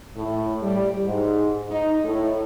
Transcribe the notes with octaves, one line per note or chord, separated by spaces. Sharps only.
A2
G3
G#2
D#4
A2